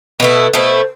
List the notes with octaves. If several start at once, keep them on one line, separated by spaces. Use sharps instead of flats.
B2 A3 E4 B4
B2 A3 E4 C5